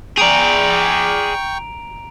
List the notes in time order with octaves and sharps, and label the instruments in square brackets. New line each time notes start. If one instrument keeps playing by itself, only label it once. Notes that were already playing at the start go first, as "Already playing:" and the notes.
[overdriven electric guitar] G#4 D5 [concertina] G5 C#6 [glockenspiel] A#5 D7 F7